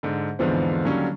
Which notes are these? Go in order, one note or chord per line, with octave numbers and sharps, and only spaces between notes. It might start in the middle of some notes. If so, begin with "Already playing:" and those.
G#2 D3
E2 G#2 D3 F3 B3 C4
D3 D#3 F#3 G3 A#3 C#4